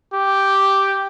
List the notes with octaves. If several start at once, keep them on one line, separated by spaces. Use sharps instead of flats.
G4